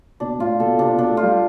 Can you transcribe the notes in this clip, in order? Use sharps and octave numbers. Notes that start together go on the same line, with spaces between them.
B2 D4
A2 F4
B2 A4
C3 D4
B2
D4
A3
F4
G3